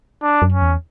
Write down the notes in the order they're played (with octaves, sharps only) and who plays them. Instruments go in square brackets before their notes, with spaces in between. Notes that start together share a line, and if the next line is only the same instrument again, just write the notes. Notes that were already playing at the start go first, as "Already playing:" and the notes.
[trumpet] D4
[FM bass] F#2
[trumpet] C#4
[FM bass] E2